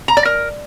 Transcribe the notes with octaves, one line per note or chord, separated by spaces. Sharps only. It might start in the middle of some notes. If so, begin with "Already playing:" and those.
A#5
D5
A#4